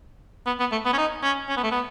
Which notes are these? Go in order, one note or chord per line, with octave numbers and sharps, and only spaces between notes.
B3
B3
A3
B3
C#4
D#4
C#4
C#4
B3
A3
B3